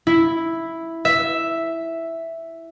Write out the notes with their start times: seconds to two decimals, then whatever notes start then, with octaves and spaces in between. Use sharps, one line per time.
0.07 E4
1.05 E5